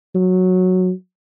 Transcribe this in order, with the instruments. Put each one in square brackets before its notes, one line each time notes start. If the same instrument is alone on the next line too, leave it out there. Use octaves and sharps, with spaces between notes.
[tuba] F#3